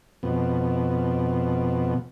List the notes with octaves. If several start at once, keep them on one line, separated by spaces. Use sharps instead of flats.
F2 B2